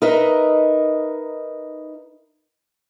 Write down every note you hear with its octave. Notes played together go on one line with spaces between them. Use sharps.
D#4 A#4 B4 D#5 E5